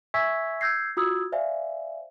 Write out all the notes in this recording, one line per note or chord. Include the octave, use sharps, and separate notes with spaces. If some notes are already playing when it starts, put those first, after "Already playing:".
E5 G#5 C#6 E6 G#6 B6
E6 G6 G#6 A#6 C7
F4 F#4 D#6 E6 G#6
C5 D5 E5 F5 G#5